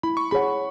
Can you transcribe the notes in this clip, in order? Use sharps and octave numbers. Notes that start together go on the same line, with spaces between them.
E4 B5
C#6
G#4 C#5 F#5 B5